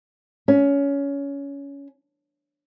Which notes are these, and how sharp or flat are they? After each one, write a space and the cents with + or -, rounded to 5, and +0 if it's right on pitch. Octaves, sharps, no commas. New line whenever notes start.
C#4 +20